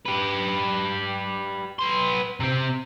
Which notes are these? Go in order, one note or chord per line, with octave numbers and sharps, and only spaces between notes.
G4 B4
B3 C6
C3 C4